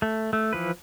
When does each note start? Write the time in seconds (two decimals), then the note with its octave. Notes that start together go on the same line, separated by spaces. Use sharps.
0.02 A3
0.33 A3
0.53 E3 F3 B4